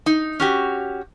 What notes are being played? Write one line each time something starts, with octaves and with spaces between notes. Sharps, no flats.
D#4
C#4 F#4 G4